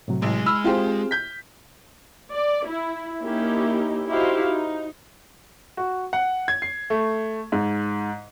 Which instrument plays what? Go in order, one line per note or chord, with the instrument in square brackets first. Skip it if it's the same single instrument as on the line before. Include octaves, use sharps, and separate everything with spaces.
[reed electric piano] A2 C3 F#3
[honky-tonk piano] A1 [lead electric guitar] G#3
[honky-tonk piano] B5 E6 F6
[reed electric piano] C4 G#4 [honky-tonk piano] F4 G4 C5
[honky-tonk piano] G6 B6
[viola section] D5
E4
A#3 C#4 D#4 E4 G4
D#4 E4 F#4 G4 C5 F5
D#4
[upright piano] F#4
F#5
G#6
C7
A3
G#2